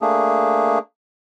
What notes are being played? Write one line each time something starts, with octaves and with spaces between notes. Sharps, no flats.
A3 A#3 D4 G#4